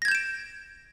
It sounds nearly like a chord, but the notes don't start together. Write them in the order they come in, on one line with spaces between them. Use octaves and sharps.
A#6 G#6 G6 E7 D7